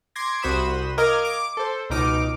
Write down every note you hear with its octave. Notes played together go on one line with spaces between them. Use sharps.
C6 D6 G#6 A#6
C2 F#4 C5 B5 D#6 E7
A#4 D#5 F5 D6 F6 G#6
D6
A4 C5
C#2 B2 D#4 D6 F6 D7